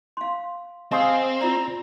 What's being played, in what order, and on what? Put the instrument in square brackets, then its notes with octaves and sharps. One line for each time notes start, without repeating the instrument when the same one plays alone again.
[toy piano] F5 C6
[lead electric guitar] C4 [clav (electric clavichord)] G#4 C5 [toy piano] D#5 [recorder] F5
[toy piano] F4 D5 [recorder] A#5